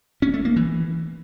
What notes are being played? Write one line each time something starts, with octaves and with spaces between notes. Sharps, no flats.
C#4
A3
A#3
E3